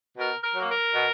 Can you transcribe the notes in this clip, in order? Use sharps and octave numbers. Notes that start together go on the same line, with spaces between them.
B2 A#4
A#4
F#3 A#3
A#4
B2